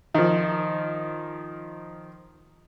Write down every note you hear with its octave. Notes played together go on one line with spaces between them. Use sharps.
D#3 F3